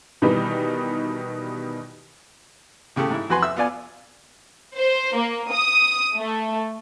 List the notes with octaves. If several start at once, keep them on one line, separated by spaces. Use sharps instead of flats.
B2 D#3 E3 G3 D#4
A2 C#3 G4 A4
G#2 E4
F2 F#4 B4 G#5 C6
E5 E6
B3 F4 D5 G#5
C5
A#3
D#6
A3